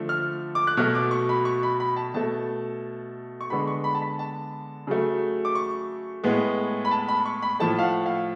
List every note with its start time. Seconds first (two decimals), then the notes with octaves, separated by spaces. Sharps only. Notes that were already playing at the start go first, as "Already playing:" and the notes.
Already playing: D3 F3 A3
0.09 F6
0.55 D6
0.67 F#6
0.77 B2 F#3 A3 F6
0.95 D6
1.11 C#6
1.29 B5
1.45 C#6
1.63 B5
1.80 B5
1.96 A5
2.14 B2 A3 A5
3.41 C#6
3.50 D3 G#3 B3 B5
3.67 C#6
3.84 B5
3.95 A5
4.02 B5
4.19 A5
4.87 C#3 F#3 A3
5.45 D6
5.55 C#6
6.24 A2 G#3 B3
6.85 B5
6.91 A5
7.08 B5
7.25 C#6
7.43 B5
7.60 A2 F3 A3 A5
7.79 F5
7.83 F#5
8.06 F5